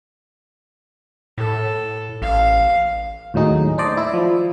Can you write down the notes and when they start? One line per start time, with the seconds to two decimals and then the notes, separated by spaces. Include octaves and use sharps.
1.38 A2 A4
2.22 A1 F5
3.34 D#2 A2 F#3 D#4 G#4
3.78 D4 C5 D5 D#5
3.97 E4
4.14 F3